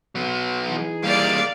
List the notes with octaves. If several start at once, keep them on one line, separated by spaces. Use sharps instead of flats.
F#3 B3
E3 D#4 G#4
G3 A#3 D5 F5